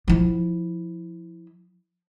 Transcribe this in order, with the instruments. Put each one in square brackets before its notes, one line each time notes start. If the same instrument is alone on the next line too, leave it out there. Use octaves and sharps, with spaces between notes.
[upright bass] F3 E4